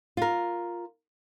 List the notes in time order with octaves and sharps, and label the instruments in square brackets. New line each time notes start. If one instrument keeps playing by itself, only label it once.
[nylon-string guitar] F4 A#4